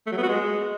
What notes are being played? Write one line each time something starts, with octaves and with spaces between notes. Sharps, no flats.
A3
F#3
B3
F#4
G#3